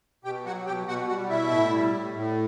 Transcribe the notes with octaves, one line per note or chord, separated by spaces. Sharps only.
B2 G4 G5
F#3 F#4 F#5
B2 G4 G5
B2 F#4 F#5
G3 F#4 F#5
B2 E4 E5
A2
G3
A2
A2